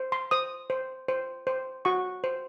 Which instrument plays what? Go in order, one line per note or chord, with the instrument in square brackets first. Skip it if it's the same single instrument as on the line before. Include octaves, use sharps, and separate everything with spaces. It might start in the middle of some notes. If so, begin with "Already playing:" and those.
Already playing: [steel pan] C5
C6
C5 D#6
C5
C5
C5
F#4 C#6
C5